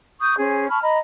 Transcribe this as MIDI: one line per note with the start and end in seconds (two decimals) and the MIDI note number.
0.20 0.36 85
0.20 0.36 87
0.20 0.36 91
0.38 0.69 61
0.38 0.69 68
0.38 0.69 72
0.69 0.80 81
0.69 0.80 83
0.69 0.80 85
0.69 0.80 89
0.81 0.98 75
0.81 0.98 82
0.81 0.98 83